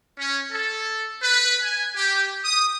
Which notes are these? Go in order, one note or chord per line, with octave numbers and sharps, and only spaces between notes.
C#4
A4
B4
G#5
G4
D#6